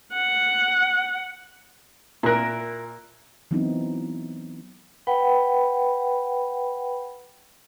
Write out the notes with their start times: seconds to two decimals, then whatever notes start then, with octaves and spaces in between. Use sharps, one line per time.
0.13 F#5
2.23 A#2 E4 A#4 F#6
3.51 E3 F#3 B3 C4 D#4 E4
5.07 B4 F#5 G5 B5